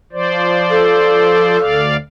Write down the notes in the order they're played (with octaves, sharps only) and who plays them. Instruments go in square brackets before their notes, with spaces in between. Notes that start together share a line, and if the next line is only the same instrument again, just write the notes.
[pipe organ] F3 C5 D5
[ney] A4
[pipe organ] D2 D5 F5